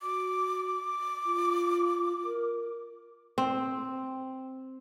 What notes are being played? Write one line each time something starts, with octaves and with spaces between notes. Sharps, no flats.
F#4 D6
F4
A#4
C4